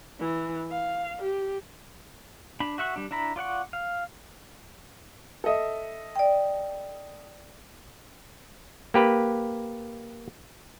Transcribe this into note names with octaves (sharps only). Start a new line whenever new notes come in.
E3
F5
G4
D4 B5
F#4 E5 F#5 C#6
G3 D4
D4 E4 A#5 B5
F4 D5 F#5 C#6
F5
A4 D#5 E5
D5 G5
A#3 G4 B4